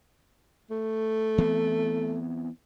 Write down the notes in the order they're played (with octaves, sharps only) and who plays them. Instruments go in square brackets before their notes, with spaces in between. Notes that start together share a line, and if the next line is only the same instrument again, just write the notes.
[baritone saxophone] A3
[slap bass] E3 B3 C4